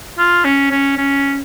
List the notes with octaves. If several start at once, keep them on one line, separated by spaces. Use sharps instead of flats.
F4
C#4
C#4
C#4